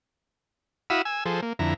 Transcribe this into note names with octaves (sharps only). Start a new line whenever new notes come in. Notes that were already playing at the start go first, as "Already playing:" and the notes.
E4 F#4 F5 B5 D#6 E6
G#5 E6
F3 G#4 A4 C5
A#3
F2 D3 E4 A#5